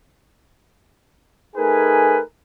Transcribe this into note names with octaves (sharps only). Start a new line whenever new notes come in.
A3 D#4 G#4 A#4 B4 G#5